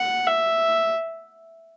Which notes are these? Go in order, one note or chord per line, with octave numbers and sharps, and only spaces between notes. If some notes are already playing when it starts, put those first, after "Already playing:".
Already playing: F#5
E5